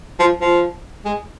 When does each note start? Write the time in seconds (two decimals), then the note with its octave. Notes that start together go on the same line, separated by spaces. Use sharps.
0.20 F3
0.41 F3
1.05 G#3